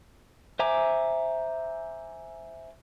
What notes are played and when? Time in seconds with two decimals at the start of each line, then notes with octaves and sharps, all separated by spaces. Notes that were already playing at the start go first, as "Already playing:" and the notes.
0.59 C5 E5 G#5 A#5 D6